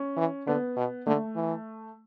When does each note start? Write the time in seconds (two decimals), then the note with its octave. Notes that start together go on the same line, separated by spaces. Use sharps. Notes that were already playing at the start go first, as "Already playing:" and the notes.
Already playing: C#4
0.17 E3
0.47 D3 B3
0.76 B2
1.06 D3 A3
1.36 E3